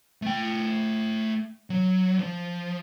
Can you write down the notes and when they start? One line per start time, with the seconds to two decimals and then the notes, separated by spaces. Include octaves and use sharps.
0.22 A3 G5
1.70 F#3
2.19 F3